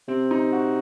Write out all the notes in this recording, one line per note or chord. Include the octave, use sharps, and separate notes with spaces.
C3 C4
D#4
F#4